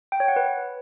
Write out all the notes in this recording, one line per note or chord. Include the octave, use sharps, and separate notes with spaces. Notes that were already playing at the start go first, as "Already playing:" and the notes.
G5
C#5
F#5
B4